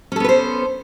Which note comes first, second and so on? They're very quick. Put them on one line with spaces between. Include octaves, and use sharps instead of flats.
C#4 A4 B3 B4 C5